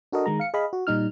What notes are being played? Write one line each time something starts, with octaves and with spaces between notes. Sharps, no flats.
D4 F#4 A4 A#4 D#5
D#3 G#3 A#5
F5 C#7
G#4 D#5 F5 B5
F#4
A#2 G3 D#4 F6